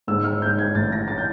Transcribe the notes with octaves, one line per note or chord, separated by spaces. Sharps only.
G#2 E6
F6
G#2 G6
G#6
A1 A6
A#6
E3 A6
G6